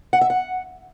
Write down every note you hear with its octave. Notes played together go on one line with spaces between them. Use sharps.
F#5
E5
F#5